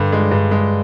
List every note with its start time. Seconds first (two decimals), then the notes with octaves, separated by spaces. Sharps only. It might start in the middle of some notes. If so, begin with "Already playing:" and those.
Already playing: G2 D3
0.12 G#3
0.31 G2
0.51 G#3